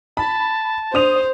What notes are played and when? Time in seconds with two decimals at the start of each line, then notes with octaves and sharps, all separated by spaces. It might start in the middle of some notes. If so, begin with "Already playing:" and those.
0.17 A5 B5
0.94 D4 C5 D#6 F7